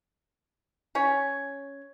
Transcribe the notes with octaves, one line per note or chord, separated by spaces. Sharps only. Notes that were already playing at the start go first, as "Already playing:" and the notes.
C#4 C#5